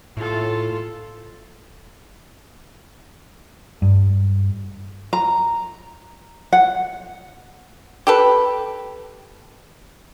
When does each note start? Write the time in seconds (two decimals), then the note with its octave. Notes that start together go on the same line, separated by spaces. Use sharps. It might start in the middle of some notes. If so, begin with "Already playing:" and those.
0.17 A2 F4 A4
3.82 G2
5.13 A#5
6.53 F#5
8.07 G4 A4 B4